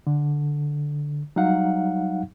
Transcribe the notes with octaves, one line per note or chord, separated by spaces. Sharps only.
D3
F#3 G3 D#4 F5 F#5